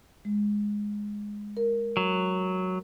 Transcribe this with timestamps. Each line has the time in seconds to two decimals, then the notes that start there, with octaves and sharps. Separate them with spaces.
0.25 G#3
1.57 A#4
1.97 F#3